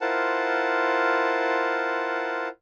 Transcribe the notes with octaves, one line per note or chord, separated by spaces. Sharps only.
E4 F4 A#4 C5 F#5 A5